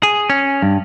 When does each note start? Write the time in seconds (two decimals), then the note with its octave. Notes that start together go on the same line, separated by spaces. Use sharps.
0.03 G#4
0.30 C#4
0.62 G2